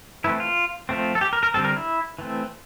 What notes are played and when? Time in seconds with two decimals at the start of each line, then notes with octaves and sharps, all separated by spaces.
0.24 E3 A3 C4 E4
0.40 F4
0.89 F3 A3 C4
1.15 A4
1.21 G4
1.33 A#4
1.43 A#4
1.54 D3 G3 C4 A4
1.64 A#4
1.76 E4
2.19 E3 A3 C4